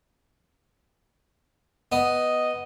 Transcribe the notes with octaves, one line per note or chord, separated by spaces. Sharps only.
B3 D#5